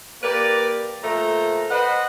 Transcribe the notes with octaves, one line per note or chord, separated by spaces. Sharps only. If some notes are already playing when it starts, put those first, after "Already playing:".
A#3 G4 A#4 B4 D5
A#2 F3 A3 C5 A#5
B4 C5 D#5 F#5